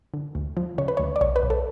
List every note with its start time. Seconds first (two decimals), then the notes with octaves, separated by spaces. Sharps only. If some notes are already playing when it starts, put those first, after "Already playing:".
0.14 D3
0.35 D2
0.57 F3
0.78 C#3 C#5
0.88 B4
0.97 C#5
1.00 D2
1.16 D5
1.21 B1 C#5
1.36 B4
1.43 B1
1.50 A4